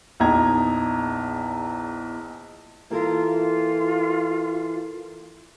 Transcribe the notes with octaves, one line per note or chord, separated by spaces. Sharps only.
A#1 E2 D#4 A#5 G#6
E3 A#3 F4 A4 A#4